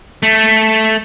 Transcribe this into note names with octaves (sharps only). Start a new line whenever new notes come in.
A3